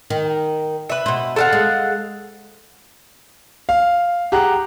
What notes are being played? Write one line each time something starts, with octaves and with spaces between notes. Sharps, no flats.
D#3
B4 E5
B2 C5
A4 F5 F#5
G#3
F5
G4 G#4 F#5 A#5 F#6